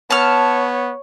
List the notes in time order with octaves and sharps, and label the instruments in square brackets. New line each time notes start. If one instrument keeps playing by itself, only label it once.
[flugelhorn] B3 [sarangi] C#5 [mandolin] A5 F6